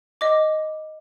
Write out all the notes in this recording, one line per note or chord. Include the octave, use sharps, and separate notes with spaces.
D#5 D6